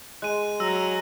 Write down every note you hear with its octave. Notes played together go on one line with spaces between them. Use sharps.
G#3 F#6 D#7
F#3 A#5 E6